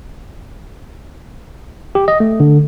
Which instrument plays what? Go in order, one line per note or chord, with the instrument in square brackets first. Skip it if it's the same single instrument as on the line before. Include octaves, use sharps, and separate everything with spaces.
[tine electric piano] G4
D#5
A3
D3